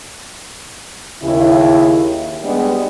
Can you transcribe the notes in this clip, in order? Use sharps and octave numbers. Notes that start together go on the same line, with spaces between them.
D#2 C#3 E4
G3 G#3 B3 D4 G#4 D#5